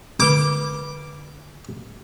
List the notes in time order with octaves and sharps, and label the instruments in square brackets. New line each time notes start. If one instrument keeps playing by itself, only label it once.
[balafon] D3 B4 B5 [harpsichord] D6